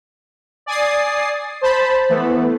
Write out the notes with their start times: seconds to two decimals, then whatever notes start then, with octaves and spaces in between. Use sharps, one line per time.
0.66 D5 G#5 D#6 A6 C7
1.61 C5 A5 B5
2.09 E3 A3 B3